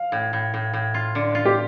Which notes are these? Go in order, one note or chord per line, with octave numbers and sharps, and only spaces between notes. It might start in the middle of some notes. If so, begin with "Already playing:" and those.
Already playing: F5
A2
A2
A2
A2
F4
D3
F4
G4